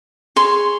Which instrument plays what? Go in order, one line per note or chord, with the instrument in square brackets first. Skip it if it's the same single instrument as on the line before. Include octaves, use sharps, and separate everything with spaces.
[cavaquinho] G#4 C#5 C6